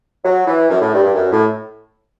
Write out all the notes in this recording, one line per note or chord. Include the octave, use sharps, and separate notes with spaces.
F#3
E3
F#2
A2
G2
G2
F#2
A2